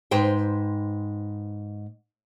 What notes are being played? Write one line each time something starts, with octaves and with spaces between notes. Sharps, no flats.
G#2 B4 C5 G5